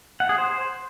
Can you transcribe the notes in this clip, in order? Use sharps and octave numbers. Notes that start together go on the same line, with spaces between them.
F#5
G#4
C5